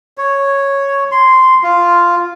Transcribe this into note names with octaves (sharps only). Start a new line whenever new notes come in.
C#5
C6
F4